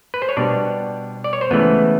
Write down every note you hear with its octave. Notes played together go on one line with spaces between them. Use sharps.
B4
C5
C#5
B2 G3 B3 D4 D5
D5
C#5
C5
C#2 C#3 E3 A3 B3 B4